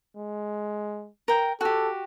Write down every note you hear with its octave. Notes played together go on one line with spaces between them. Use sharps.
G#3
A#4 G5
F#4 G4 A4